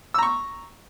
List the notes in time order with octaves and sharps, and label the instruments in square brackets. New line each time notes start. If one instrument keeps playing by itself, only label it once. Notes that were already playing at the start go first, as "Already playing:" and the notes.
[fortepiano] E6
A#5
C#6